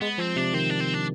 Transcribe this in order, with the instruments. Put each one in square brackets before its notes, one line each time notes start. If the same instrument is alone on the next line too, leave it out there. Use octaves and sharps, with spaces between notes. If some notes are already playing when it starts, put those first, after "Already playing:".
[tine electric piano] G#3 [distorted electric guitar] B3
[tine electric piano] F3 [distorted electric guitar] C4
[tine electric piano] C3 [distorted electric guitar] D4
[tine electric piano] D#3 [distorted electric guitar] C4
[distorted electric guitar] D4
C4
D4